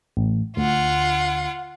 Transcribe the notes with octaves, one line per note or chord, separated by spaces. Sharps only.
A1
D2 F4 F#5